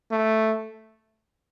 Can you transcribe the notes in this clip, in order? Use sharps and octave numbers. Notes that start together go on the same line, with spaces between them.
A3